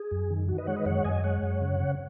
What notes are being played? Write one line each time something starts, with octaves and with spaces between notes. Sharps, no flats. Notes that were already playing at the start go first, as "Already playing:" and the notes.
Already playing: G#4
F#2
D#3
D#3 F#4
B4 D#5
G#3 C#5 F#5
B4 D#5
F#2 C#5 F#5
F#2 D#5 G#5
G#3 C#5 F#5
F#2
C#3
C#3